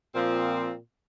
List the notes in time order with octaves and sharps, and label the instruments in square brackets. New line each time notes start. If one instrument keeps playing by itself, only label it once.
[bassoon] A#2 [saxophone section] F3 C4